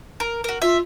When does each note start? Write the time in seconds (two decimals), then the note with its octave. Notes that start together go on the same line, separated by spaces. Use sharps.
0.20 A#4
0.44 F#4 A#4
0.62 F4 E5